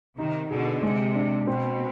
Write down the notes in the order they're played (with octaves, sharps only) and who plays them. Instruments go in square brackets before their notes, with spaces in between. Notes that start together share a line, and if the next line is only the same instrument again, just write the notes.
[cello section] C3 D#3 [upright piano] D#4
[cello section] B2 D3 [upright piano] G#4
[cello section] C3 [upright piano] G#3
[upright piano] D4
[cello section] B2 [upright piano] C4